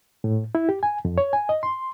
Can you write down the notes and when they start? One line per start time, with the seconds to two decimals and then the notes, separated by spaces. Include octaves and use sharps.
0.24 A2
0.55 E4
0.69 G4
0.83 G#5
1.05 F2
1.18 C#5
1.33 G#5
1.49 D#5
1.63 C6